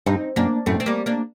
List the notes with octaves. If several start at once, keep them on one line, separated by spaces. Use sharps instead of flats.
G2 C4 D#4
F#2 A#3 D4
F#2 A2 A3 C4
C4
G3 A#3
A#3 D4